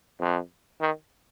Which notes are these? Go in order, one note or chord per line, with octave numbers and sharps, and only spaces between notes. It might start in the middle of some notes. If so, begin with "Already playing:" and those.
F2
D#3